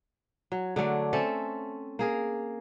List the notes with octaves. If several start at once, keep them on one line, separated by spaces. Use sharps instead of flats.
F#3
D3 F#3 A3 D4
C4 C#4 A4 E5
A#3 G#4 A#4